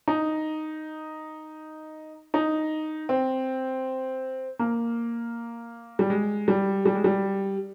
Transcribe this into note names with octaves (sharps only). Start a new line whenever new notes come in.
D#4
D#4
C4
A#3
G3
G#3
G3
G3
G#3
G3